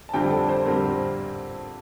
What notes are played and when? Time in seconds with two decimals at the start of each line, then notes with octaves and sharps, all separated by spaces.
0.09 A5
0.14 F2 D3 G3 C4 G5
0.31 A4
0.49 C5
0.65 F2 D3 G3 C4 A#4